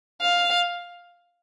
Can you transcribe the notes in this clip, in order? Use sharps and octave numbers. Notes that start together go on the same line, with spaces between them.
F5